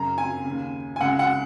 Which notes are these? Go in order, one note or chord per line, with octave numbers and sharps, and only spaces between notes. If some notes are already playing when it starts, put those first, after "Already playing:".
Already playing: F#2 C#3 A#5
G#5
D#2 C#3
G#5
C#2 C#3 F#5
F#5